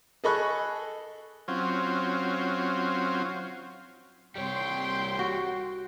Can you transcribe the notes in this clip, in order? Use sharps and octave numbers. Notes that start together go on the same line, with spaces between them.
G#4 A4 D#5 B5 C#6 F#6
F#3 C4 C#4 F4
C2 G3 C#5 G5 C6
F#4